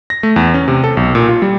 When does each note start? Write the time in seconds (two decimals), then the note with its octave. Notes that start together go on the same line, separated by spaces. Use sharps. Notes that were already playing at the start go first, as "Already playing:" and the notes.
0.10 A#6
0.23 A3
0.36 E2
0.54 C#4
0.68 C3
0.84 A4
0.97 B1
1.15 A#2
1.29 F4
1.42 G3